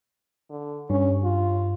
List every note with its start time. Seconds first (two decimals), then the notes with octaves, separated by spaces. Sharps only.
0.50 D3
0.90 G2 C#4
1.24 F4